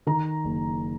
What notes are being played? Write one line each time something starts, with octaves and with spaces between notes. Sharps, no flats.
D#3 A#5
F#1